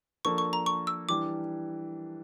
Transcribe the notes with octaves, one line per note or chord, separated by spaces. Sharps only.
F3 A#3 D4 A4 C#6
C#6
A#5
C#6
E6
E3 G3 D4 D6